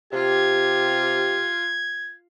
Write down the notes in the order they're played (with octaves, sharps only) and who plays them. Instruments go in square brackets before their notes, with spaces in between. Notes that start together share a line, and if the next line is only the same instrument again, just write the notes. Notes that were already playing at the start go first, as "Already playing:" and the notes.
[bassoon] C3 [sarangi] F4 [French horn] G4 [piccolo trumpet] G#6